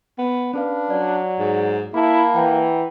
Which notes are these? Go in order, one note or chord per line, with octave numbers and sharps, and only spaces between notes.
B3
C#4 D4 B4 F5
F#3 D5
G#2
A#3 E4 A5 B5
E3 F#5 G5 A#5